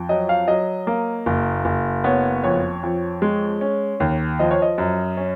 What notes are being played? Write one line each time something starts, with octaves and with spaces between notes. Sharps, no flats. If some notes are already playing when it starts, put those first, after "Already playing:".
Already playing: F2
F#3 D#5
F5
F#3 D#5
A#3
F#1
F#1
B3 C#5
F2 C#5
F2
G#3
C#4
D#2
F3 D#5
C#5
D#5
F#2
C#4